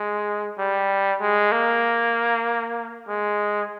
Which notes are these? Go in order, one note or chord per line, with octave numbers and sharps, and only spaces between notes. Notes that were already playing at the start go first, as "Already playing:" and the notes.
Already playing: G#3
G3
G#3
A#3
G#3